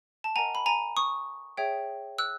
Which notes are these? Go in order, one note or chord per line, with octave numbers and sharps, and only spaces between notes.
A5
A#4 D#5 F#5 G#5 A#5
B5
G#5 A#5
C#6 D#6
G#4 C#5 E5 G5
E6 F#6